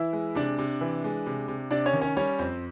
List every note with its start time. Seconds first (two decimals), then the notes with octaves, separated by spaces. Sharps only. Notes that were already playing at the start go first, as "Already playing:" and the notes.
Already playing: E3 E4 E5
0.13 G#3
0.35 C3 D4 D5
0.59 C3
0.81 E3
1.04 G#3
1.27 C3
1.48 C3
1.71 C3 D4 D5
1.86 C#4 C#5
1.93 D#3
2.01 C#4 C#5
2.17 G3 C#4 C#5
2.39 F2 C4 C5